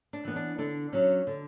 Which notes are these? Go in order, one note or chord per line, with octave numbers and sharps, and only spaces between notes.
D4
E3 B3
D4
D3 D4
F#3 C#4
D3